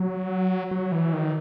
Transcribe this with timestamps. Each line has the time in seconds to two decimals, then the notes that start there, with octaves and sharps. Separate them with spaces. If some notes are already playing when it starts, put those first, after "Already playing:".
Already playing: F#3
0.71 F#3
0.92 E3
1.13 D#3